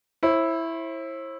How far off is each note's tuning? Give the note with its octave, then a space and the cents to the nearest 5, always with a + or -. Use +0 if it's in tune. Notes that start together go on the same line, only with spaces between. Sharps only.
E4 +0 C5 +45